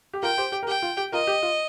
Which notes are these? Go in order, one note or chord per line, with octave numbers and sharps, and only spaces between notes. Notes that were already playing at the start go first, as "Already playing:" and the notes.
G4
F4 A#4 G5
G4 C5
G4
A#4
G4 G5
F4
G4
F4 A#4 D#5
G4
F4